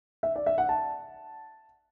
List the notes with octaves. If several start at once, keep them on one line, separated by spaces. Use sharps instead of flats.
E5
D5
E5
F#5
A5